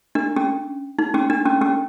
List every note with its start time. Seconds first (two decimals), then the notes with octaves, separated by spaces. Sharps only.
0.15 D4
0.36 C#4
0.99 D#4
1.14 C#4
1.30 D4
1.46 C#4
1.62 C#4